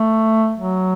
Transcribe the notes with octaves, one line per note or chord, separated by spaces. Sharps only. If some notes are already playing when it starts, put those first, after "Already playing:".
Already playing: A3
F#3